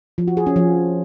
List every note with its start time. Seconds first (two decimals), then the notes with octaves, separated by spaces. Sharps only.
0.18 F3
0.27 F#4
0.37 G#4
0.46 C#4
0.56 F3